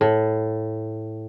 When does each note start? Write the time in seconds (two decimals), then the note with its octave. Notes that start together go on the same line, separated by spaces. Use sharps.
0.01 A2